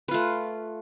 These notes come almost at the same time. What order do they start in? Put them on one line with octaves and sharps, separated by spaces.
B4 F4 A3